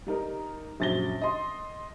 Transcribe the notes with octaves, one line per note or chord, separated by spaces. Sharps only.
G3 D#4 A#4
A#1 F#2 A6 A#6 G7
D#5 C6